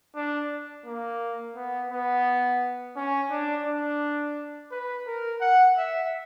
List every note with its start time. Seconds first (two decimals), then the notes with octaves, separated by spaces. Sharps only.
0.16 D4
0.86 A#3
1.56 B3
1.91 B3
2.97 C#4
3.31 D4
3.66 D4
4.71 B4
5.07 A#4
5.41 F#5
5.77 E5